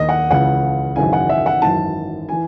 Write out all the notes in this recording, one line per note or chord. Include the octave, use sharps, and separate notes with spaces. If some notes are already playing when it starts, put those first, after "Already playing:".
Already playing: D#2 D#3 D#5
F#5
C#2 C#3 E3 F#5
G#1 F#2 C#3 E3 G#5
F#5
E5
F#5
G#1 F#2 E3 A5
E3 G#5